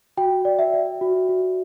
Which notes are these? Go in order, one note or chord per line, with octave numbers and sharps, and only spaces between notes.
F#4 G5
D5
E5
D5
F#4
F#4